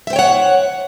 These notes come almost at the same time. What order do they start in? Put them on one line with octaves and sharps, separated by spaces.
E5 C5 G5 C#5 F#5